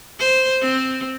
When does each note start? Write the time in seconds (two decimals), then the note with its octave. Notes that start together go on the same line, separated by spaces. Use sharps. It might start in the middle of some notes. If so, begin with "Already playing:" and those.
0.19 C5
0.62 C4